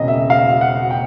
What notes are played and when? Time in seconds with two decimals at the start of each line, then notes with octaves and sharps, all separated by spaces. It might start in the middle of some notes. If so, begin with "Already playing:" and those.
Already playing: E1 C#3 D#5
0.08 E5
0.30 F5
0.61 F#5
0.90 G5